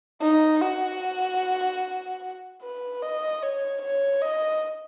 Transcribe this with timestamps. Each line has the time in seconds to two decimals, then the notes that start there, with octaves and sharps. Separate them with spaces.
0.21 D#4
0.62 F#4
2.62 B4
3.03 D#5
3.42 C#5
3.82 C#5
4.22 D#5